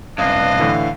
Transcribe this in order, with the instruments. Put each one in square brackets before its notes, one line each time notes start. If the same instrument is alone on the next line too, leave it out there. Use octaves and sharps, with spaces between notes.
[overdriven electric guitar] C2 F#2 [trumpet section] D4 B4 D#5 [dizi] F5
[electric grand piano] A2 D3 E3